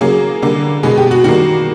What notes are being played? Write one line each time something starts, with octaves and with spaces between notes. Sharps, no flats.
C#3 F#3 A#3 G#4
D3 G3 A#3
B2 G#3 B3 G#4
G4
F#4
D#3 G3 A#3 F#4